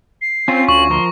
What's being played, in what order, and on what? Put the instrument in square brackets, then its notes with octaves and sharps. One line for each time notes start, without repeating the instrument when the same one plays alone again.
[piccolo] C7
[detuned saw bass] C4 [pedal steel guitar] C#4 F4
[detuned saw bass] D2 [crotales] C#6 [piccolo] F#7
[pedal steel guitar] F3 A#4 [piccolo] C6